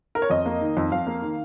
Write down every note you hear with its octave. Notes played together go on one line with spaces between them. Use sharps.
A#4
C#5
F2 D#5
A#3
D#3
F2
F2 F5
A#3
D#3